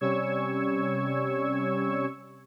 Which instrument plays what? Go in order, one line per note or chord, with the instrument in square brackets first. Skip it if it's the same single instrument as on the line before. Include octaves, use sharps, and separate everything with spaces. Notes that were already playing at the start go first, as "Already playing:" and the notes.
[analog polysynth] C3 G3 C#4 C#6 E6 G#6